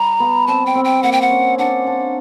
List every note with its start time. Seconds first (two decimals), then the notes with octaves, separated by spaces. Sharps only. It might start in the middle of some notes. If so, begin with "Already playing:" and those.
Already playing: G3 A#5
0.20 B3
0.47 C4 A5
0.66 G5
0.75 C4
0.84 G5
1.03 A#3 F#5
1.12 G5
1.21 F#5
1.30 C#4
1.59 D4 F#5
1.87 D4